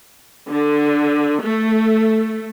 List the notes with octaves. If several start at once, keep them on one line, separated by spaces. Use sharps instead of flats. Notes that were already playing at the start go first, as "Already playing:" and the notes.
D3
A3